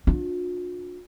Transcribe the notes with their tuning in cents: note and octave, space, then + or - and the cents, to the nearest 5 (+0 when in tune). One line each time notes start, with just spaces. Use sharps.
D4 +0 F4 +45